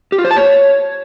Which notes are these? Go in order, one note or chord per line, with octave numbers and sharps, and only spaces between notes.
G4
F4
C5
A5
C#5